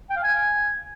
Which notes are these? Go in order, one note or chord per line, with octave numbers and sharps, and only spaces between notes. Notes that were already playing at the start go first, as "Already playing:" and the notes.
G5
F5
G#5